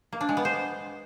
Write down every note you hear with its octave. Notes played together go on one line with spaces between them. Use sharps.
A#3
D4
G#3
B3
C5